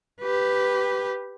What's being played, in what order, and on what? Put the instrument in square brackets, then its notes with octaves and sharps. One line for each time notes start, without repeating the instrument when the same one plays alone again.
[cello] G4 B4